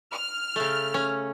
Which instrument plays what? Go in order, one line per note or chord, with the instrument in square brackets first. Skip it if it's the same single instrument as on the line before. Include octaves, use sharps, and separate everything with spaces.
[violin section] F6
[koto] C#3 A3
C#4